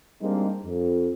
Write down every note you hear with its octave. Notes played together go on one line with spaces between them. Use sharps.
G3 G#3 A#3 C4 D4 D#4
F2